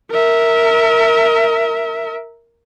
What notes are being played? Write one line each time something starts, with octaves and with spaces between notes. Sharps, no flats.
A#4 E5